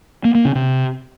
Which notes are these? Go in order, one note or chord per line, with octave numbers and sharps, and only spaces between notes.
A#3
A#3
C#3
C3